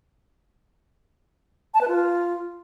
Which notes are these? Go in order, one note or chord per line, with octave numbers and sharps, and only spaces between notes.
A5
B4
F4